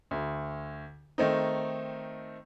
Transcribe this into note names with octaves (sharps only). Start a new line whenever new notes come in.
D2
D#3 A3 C4 D#4